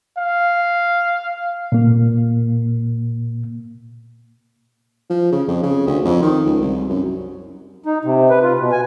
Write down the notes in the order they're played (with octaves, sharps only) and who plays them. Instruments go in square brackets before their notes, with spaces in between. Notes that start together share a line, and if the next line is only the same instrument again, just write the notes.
[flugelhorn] F5
[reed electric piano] A#2 A#3
[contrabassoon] F3
C#3
F2
C#3
D2
F2
D#3
C#2
C2
F#2
[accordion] D#4
C3
B4
F4
B2
G#5